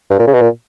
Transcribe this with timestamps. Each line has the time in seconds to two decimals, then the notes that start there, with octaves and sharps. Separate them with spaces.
0.10 G2
0.19 A#2
0.27 C#3
0.34 B2
0.41 A#2